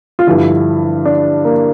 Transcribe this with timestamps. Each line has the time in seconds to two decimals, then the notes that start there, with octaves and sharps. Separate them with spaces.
0.19 F4
0.27 G2 D3 F3 E4
1.05 D4
1.45 A#3